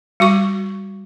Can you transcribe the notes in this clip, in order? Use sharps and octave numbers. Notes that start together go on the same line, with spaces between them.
G3 F#4 C#6